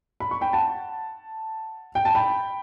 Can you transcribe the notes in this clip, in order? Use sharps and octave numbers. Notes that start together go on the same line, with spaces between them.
B5
C#6
G5 B5
F#5 A5
G5
A5
G5 B5